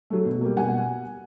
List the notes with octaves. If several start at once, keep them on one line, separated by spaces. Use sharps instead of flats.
F#3 A3
B2
G3 A#3
B2 F#5 G#5